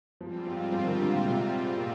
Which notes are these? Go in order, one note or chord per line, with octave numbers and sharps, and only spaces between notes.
G#2 F3 G3 C4 F4
F3
F3
D#3
D3
A#2
C3
A#2